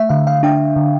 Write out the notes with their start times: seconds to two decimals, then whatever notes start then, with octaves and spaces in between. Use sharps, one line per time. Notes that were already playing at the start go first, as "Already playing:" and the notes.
Already playing: A3 E5
0.09 D3 F5
0.27 F5
0.43 D4 G5
0.76 D3